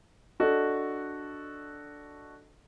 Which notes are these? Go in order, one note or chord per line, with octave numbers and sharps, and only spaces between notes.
D4 F#4 A4 D#5